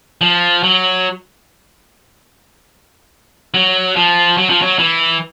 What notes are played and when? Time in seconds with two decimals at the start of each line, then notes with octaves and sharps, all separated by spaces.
0.21 F3
0.63 F#3
3.54 F#3
3.96 F3
4.37 F#3
4.50 F3
4.62 F#3
4.79 E3